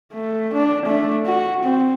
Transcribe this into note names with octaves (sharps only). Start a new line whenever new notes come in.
A3
D4
A3 D4
F#4
C4